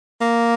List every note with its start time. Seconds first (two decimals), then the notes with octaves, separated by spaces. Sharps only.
0.21 A#3